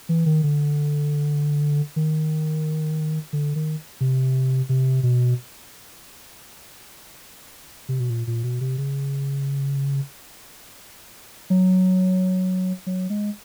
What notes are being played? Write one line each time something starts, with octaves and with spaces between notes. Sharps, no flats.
E3
D#3
D3
D#3
D3
D#3
C3
C3
B2
C3
B2
A#2
A#2
B2
C3
C#3
F#3
F#3
G#3